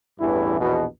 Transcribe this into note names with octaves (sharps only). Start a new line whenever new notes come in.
A1 E2 G2 E3 E4
A#1 E2 B2